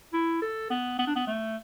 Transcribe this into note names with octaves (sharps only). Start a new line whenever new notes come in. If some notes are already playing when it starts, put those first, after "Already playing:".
E4
A4
B3
B3
D4
B3
A3